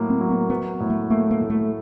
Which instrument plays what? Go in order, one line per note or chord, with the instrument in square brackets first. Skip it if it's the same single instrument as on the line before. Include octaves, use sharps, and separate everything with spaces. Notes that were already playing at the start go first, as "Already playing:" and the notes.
Already playing: [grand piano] A2 F#3 A#3
[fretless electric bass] C4
[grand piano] F#3
[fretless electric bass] B3
[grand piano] F#3 [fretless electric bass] B3
[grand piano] A2
[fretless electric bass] A3
[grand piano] A3 [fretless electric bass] A#3
[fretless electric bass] A#3
[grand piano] A2
[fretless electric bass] A3